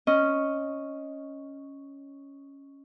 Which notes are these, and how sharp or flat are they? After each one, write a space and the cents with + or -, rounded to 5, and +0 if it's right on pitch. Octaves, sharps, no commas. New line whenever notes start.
C#4 +0 D#5 +0